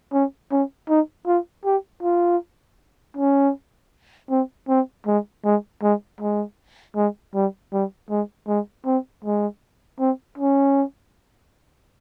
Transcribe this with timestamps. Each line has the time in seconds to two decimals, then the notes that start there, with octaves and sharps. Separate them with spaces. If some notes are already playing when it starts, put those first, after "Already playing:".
0.13 C#4
0.51 C#4
0.89 D#4
1.27 F4
1.65 G4
2.03 F4
3.17 C#4
4.30 C4
4.68 C4
5.06 G#3
5.44 G#3
5.82 G#3
6.20 G#3
6.96 G#3
7.35 G3
7.73 G3
8.10 G#3
8.48 G#3
8.86 C4
9.24 G#3
9.99 C4
10.38 C#4